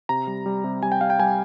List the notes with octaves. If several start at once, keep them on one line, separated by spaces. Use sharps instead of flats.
C3 A#5
G3
G3
C3
G3 G#5
G5
G3 F5
G5
G3 G#5